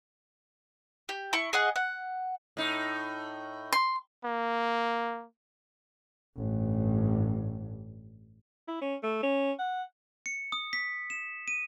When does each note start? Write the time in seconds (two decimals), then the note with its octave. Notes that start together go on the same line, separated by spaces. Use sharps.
1.09 G4
1.33 E4 C#6
1.53 G#4 D#5 F#5
1.76 F#5
2.57 A2 D#4
3.73 C6
4.24 A#3
6.37 A1 G2
8.68 E4
8.81 C#4
9.03 A3
9.23 C#4
9.59 F#5
10.26 C#7
10.52 D#6
10.73 B6
11.10 E7
11.48 D#7